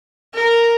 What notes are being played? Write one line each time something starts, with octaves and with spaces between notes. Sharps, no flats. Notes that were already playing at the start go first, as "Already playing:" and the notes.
A#4